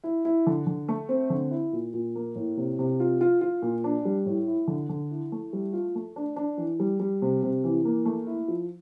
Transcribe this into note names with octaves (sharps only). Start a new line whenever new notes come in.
E4
E4
D3
D3
A3
C4
D3
E4
A#2
A#2
A#3
A2
C3
C3
F4
F4
F4
A#2
D4
G3
A2
E4
D3
D3
E4
A3
G3
F4
A3
D4
D4
E3
G3
G3
C3
C3
E3
A#3
A3
E4
F3